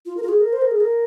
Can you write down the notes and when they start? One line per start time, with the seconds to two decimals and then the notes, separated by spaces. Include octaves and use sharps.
0.06 F4
0.17 A#4
0.22 F4
0.29 G#4
0.41 A#4
0.53 C5
0.62 A#4
0.71 G#4
0.80 A#4